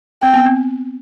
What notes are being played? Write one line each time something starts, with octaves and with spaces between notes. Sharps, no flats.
C4 G5
B3
C4